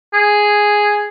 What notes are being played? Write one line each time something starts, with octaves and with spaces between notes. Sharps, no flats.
G#4